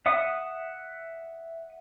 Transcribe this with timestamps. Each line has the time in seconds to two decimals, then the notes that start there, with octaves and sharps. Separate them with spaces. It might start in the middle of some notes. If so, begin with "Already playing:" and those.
0.06 E5 F#5 D#6